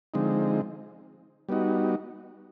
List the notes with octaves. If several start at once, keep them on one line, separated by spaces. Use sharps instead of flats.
D3 F3 G#3 C4 D#4
G3 B3 D#4 F#4